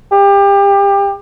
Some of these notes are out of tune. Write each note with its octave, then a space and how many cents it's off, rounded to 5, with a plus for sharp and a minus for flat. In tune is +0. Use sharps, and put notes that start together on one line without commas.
G4 +30